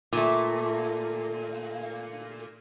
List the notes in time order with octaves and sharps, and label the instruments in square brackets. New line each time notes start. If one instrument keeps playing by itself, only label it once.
[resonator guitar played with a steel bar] A#2 A3